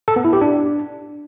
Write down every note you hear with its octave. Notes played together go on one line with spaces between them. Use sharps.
A4
B3
E4
G4
D4